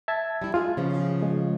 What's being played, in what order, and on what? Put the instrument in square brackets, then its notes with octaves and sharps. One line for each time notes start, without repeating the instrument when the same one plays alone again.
[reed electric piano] E5 A5 G#6
[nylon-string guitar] G3 E4
[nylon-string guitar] G#3 G#4 [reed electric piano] F4
[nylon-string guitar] C#3 F3 B3
[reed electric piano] G#3